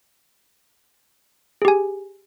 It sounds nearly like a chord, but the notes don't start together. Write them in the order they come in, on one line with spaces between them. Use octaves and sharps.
G#4 G4 G#5